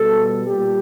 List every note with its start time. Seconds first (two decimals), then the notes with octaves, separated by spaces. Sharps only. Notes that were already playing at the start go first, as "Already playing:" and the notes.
Already playing: B2 G3 A4
0.47 A#2 G3 G4